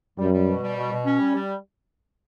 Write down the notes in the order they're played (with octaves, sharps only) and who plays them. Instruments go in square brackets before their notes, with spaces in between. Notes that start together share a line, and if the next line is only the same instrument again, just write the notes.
[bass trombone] F#2 [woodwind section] G3
[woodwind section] G3
B2
G3
B2
B2
C#4
G3
G3